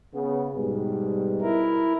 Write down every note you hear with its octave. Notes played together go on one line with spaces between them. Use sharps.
C#3 B3
G#2 B2 G3
E4 A#4